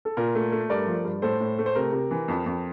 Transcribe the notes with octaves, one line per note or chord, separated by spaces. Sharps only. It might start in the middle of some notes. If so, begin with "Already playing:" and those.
A4
A#2 A#4
A3
A3
G2 A#4 D5
F3
G2
A2 A4 C5
A2
A3
C5
C3 A#4
C3
E3
F2
F2